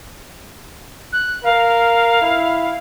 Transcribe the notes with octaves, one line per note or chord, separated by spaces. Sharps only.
F#6
A#4 F5
E4